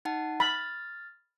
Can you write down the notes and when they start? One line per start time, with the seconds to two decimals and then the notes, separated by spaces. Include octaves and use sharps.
0.05 D#4 F#5 A5
0.40 B5 F6 A6